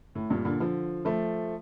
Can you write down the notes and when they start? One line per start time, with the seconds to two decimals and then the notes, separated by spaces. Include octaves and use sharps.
0.15 A2
0.30 G2 A#2
0.45 A#2 D3
0.60 D3 F3
1.05 F3 A3